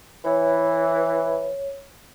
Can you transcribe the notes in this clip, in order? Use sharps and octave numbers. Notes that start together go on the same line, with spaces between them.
E3 C#5